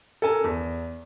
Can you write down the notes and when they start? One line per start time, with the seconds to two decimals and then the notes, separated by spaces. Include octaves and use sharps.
0.22 A4 A#4 G#5 A5
0.44 E2